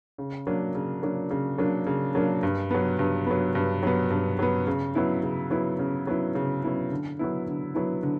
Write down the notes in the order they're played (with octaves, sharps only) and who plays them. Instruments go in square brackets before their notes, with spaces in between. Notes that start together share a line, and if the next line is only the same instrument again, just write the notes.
[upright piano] C#3
F#3 A#3 D4
C#3
F#3 A#3 D4
C#3
F#3 A#3 D4
C#3
F#3 A#3 D4
G2
F#3 B3
G2
F#3 B3
G2
F#3 B3
G2
F#3 B3
C#3
F#3 B3 E4
C#3
F#3 B3 E4
C#3
F#3 B3 E4
C#3
F#3 B3 E4
D3
F#3 B3 E4
D3
F#3 B3 E4
D3